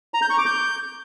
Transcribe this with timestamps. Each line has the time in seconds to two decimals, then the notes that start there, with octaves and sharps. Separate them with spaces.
0.14 A#5
0.22 G6
0.30 C#6
0.38 D6
0.46 G6